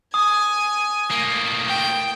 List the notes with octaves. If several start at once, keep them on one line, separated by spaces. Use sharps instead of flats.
G#5 D#6
A2 A#3
G5